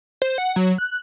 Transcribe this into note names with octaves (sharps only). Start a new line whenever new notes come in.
C5
F#5
F#3
F#6